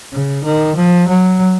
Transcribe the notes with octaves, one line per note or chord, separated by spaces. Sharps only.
C#3
D#3
F3
F#3